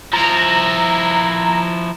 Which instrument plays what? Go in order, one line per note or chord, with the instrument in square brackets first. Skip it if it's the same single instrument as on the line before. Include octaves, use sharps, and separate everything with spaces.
[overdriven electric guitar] F3 E4 [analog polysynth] A#5